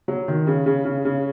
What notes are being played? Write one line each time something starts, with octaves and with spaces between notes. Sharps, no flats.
F#3
D#3
C#3
C#3
C#3
C#3